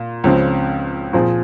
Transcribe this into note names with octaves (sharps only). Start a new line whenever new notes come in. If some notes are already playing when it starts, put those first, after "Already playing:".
Already playing: A#2
C#2 C#3 F3 C4
A#2 F3 C4 F4 G#4